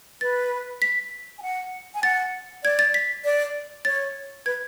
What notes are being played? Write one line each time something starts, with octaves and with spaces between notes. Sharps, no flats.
B4 A6
B6
G#5
F#5
G#5
F#5 A6
D5 G#6
A6
B6
D5
C#5 A6
B4 G#6